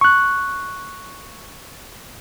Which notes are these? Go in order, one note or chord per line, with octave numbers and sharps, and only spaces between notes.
C#6 F#6